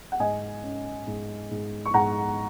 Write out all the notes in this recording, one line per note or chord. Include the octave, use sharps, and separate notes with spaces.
F#5
G#2 D#5 G#5
C#4
G#2
G#2
C#6
G#2 F#5 A#5